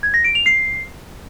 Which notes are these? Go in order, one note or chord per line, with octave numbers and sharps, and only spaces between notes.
G#6
A#6
D7
F7
C7